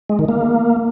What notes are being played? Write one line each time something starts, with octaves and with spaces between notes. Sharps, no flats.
G#3
D#3
A#3